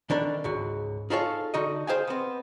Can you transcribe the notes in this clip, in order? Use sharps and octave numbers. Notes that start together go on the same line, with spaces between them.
D#3 B3 D4 A4 A#4
C#2 G#2 F#4
D#4 F4 G#4 A4 C#5 F5
D3 D#4 F#4 D#5
G#4 C5 D#5 F5 G5 G#5
B3 C4